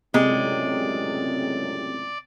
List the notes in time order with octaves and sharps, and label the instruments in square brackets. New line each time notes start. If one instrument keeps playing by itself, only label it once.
[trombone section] C#2 F#2 A2 [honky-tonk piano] C3 [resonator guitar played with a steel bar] G#3 [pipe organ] D5